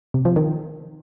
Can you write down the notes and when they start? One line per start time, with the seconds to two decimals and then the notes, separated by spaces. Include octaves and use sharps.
0.14 C3
0.25 F3
0.36 D#3